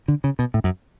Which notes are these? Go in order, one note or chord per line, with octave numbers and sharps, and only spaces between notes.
D3
C#3
B2
A2
F#2